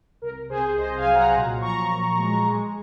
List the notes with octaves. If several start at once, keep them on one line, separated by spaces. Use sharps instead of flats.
C2 A#4
C3 G#4 C5
C2 C5 D#5
F5 G#5
F#3
F#5 A#5
A#2
F3 A#5 C#6
A#2
G#3
G#3